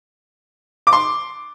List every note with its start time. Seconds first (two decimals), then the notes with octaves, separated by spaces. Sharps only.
0.87 D6
0.93 C6